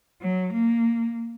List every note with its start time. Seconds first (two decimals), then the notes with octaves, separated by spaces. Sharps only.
0.22 F#3
0.53 A#3